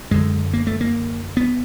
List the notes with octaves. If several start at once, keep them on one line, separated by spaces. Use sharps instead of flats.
F#2 D3 G#3
A#3
A3
A#3
B3